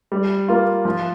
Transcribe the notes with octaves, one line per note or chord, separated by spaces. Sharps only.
G3
A#3 F4
F3